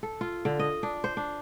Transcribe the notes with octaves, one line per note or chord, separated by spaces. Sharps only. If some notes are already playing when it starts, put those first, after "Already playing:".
A4
F4
D3
D#5
D4
C5
D4